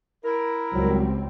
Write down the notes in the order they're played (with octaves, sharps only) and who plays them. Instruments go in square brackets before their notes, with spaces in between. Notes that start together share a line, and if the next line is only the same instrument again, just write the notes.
[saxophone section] E4 A#4
[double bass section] C#2 G3 C4 [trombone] F#3